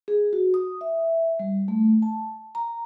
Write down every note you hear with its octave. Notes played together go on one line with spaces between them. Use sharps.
G#4
F#4
D#6
E5
G3
A3
A5
A#5